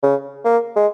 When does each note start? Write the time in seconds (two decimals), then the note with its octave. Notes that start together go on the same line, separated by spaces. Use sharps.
0.03 C#3
0.45 A#3
0.76 G#3